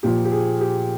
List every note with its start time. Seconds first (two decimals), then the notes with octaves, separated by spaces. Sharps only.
0.03 A#2 F3 G4
0.25 G4
0.31 G#4
0.61 G4